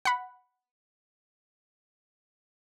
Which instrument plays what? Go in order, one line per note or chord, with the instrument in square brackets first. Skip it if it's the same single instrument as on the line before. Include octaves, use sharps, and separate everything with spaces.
[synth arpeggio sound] F#5 B5